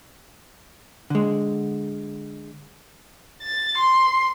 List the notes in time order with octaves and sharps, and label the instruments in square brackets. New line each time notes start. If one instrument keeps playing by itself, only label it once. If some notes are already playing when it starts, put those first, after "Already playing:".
[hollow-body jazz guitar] D3 G#3
[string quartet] A6
C6